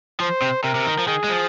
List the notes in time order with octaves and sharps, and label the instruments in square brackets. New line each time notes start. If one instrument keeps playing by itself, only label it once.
[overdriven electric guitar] F3 [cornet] C5
[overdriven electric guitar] C3
[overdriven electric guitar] C3 [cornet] A#4
[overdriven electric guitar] C3
D#3
F3
[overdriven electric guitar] D#3 [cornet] G#4
[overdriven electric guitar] G#3
F3